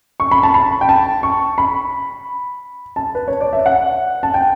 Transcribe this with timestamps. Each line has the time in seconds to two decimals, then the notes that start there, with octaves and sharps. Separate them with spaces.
0.20 C#6
0.31 B5
0.43 A5
0.54 B5
0.81 G5
0.89 A5
1.23 C#6
1.58 B5
2.96 A5
3.15 B4
3.28 C#5
3.41 D5
3.53 E5
3.66 F#5
4.23 A5
4.34 G5